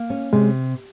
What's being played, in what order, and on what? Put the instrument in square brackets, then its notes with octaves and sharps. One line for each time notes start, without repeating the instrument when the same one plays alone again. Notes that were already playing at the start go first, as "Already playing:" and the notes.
Already playing: [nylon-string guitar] A#3
C#4
[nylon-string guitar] C3 [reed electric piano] G#3